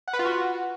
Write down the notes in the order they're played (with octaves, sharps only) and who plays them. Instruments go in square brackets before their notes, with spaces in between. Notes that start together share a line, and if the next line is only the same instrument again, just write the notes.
[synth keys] F#5
B4
F4
F#4